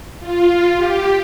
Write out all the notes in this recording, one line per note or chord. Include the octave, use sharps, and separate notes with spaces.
F4
G4